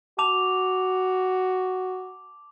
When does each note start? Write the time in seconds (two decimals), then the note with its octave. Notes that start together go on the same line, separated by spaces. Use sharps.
0.19 F#4 A5 D6 F7